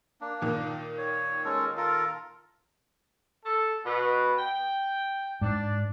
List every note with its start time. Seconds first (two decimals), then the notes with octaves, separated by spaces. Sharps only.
0.21 A#3 D4
0.42 A#2 D#3
0.98 C#5
1.45 G#3 C#4 A4
1.77 F4 A4 A#4
3.45 A4
3.85 B2 B3 B4
4.38 G5
5.41 G#2 D4